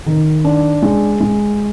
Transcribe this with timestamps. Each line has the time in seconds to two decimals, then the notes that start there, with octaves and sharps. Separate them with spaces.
0.06 D#3
0.44 D4
0.82 G#3
1.21 G#3